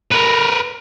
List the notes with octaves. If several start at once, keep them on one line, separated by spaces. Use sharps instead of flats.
A#4 B4